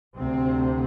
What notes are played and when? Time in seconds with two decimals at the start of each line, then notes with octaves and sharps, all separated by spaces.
0.17 D2 C3 C4